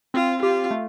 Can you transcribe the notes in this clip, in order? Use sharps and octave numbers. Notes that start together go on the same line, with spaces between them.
C4 F4
F4 G4
A3